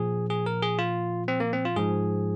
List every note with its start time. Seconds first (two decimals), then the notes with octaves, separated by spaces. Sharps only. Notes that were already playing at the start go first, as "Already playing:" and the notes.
Already playing: A#2 F3 G#4
0.30 G#4
0.46 A#4
0.63 G#4
0.79 F4
1.28 C4
1.40 A#3
1.53 C4
1.65 F4
1.76 G#2 F3 G#4